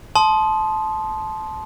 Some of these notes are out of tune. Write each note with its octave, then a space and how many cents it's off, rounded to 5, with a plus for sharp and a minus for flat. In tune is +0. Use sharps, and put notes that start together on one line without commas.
A5 -20 C6 +0 D#6 +0